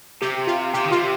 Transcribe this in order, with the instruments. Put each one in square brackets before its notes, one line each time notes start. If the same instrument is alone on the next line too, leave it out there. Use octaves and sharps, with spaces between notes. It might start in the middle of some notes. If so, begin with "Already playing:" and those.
[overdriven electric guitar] C3 [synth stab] G4
[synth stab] F4
[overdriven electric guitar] C3 [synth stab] G4
[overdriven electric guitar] D#3
[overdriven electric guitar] C3 [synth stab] F4